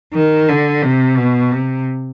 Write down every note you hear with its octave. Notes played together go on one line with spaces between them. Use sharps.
D#3
D3
C3
B2
C3